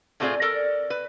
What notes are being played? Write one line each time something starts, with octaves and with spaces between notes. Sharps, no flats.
A2 A3 C4 F4 G#4 D5
A4 A#4 D5
B4